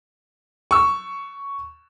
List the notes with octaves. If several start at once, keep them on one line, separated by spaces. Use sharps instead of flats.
C#6 E6